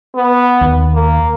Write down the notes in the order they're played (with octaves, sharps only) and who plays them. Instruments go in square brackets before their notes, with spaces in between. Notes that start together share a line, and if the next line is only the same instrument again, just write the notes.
[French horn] B3
[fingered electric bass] D#2
[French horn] A#3